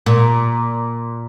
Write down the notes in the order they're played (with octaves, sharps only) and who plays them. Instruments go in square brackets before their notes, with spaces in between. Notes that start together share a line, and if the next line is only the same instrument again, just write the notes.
[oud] A#2